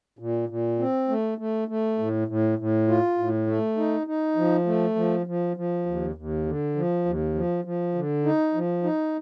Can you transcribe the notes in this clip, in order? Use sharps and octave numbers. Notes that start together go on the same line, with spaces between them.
A#2
A#2
C4
A3
A3
A3
A2
A2
A2
F4
A2
A3
D#4
D#4
F3
A3
F3
F3
F3
D#2
D#2
D3
F3
D#2
F3
F3
D3
D#4
F3
D#4